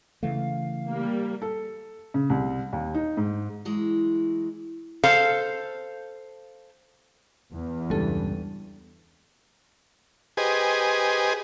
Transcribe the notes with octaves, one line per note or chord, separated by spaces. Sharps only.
C#3 E3 A3 F5
G3 A#3
A4
C#3
C2
D#2
D#4
G#2
E3 F#3 G#3 E4
A4 C5 F5
E2
C#2 G2 G3 A4
G4 G#4 B4 C5 D#5 G#5